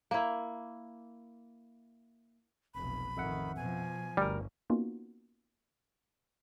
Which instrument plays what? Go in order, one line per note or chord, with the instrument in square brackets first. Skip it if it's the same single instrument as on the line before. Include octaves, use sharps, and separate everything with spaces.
[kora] A#3 E4
[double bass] F1 B1 [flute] B5
[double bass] A1 D#3 [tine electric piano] F2 E5 F#5
[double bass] B2 F3 [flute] G#5
[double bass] G1 [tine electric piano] D2 A#4 [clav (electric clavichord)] G3
[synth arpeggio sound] A#3 B3 C#4 D#4 F4 F#4